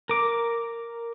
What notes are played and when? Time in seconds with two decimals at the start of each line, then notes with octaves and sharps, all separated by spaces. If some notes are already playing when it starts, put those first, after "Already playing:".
0.09 A#4 D6